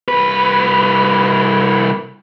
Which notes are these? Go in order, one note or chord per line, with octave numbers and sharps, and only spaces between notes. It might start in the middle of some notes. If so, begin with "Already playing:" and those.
C2 B4